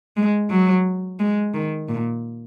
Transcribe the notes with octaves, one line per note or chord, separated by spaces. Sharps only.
G#3
F#3
G#3
D#3
A#2